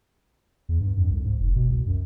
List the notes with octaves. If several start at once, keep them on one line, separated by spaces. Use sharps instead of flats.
E2
G2
F2
C2
G#2
F1
B2
C2
F#2